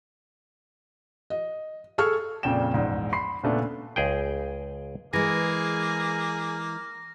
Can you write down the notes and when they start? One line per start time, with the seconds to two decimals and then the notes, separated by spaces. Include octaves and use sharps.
1.30 D#5
1.98 G#4 A4 C#6 F6
2.43 F2 A#2 C#3 D5 G5 E7
2.74 A#1 E2 G#2
3.13 B5 C6 C7
3.43 A#2 C#3 A3 B3 D4
3.96 C#2 G#4 G5
5.13 E3 G#3 A#3 G#4 A#6